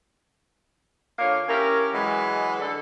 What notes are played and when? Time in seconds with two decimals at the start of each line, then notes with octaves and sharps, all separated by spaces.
1.19 D3 A#3 F4 C#5 F5
1.48 C#4 E4 G4 A#4
1.93 E3 F#3 G#3
2.60 D3 A4